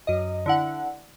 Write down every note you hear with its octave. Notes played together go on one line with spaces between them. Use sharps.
F#2 D#5
D3 E4 F#5